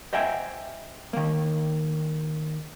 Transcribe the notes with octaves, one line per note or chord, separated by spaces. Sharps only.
C5 D#5 E5 G5 G#5
D#3 A#3